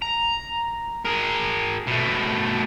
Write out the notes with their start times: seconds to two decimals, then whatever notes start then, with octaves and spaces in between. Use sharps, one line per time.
0.02 A#5
1.05 G#4 A#4
1.87 B2 A3